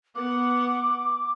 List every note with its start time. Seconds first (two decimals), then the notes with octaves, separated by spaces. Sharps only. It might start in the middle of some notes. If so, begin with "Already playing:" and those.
0.15 B3 F#5 D6